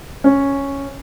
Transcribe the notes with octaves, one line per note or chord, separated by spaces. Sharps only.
C#4